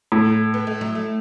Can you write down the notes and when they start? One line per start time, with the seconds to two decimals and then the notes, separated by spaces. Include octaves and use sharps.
0.12 A2
0.54 B3
0.67 A3
0.81 F#3
0.95 A3